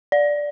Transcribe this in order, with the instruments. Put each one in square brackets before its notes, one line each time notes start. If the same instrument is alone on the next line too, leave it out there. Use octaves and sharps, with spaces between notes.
[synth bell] D5